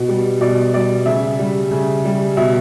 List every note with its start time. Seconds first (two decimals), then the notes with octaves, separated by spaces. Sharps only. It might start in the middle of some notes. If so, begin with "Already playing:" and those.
Already playing: B2
0.09 G3
0.41 B2 D5
0.74 G3 D5
1.06 C#3 E5
1.39 G3
1.71 C#3
2.05 G3
2.37 B2 E5